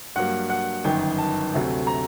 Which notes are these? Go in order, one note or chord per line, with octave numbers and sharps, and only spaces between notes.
G2 F#3 A#3 F#5
F#5
G1 F#2 D#3 G5
A5
D2 C3 F#3 A3
A#5